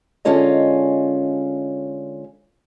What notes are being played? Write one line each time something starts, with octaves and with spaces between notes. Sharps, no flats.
D3 G#3 C#4 F4 C#5 D#5